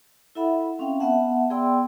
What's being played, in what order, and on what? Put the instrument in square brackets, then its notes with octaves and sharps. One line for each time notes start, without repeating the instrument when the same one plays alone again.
[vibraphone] E4 A4 E5 F#5 B5
C4 C#4 E5 F5 G5
B3 E5 F#5 A5
B3 G#4 D5 G5 C6 E6